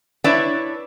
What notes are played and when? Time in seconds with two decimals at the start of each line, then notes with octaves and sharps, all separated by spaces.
0.24 D4 E4 B4 C#5 D5 E5